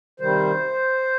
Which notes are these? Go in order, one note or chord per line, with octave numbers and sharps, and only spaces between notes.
C3 D#3 G3 C5